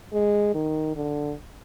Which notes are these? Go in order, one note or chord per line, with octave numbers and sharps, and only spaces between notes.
G#3
D#3
D3